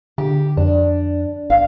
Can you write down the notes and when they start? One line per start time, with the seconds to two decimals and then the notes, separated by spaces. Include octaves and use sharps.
0.18 D3 G4
0.57 F2 D4
1.50 G#1 F5